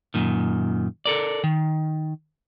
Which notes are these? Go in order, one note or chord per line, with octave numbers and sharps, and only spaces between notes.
F#2 A#2 D#3
A4 A#4 D5
D#3